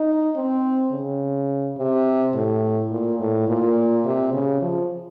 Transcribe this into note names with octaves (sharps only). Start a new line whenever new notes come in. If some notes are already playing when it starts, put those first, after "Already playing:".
Already playing: D#4
C4
C#3
C3
A2
A#2
A2
A#2
C3
C#3
F3